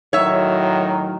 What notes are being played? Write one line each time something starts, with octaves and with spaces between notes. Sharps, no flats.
A2 D#3 F#3 C#5 E5